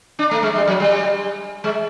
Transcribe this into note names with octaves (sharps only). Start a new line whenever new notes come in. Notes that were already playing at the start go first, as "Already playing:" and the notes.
D4
A3
G#3
G3
F#3
G3
G#3